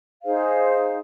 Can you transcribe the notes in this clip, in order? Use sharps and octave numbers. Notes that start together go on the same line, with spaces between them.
D#4 G#4 C5 F5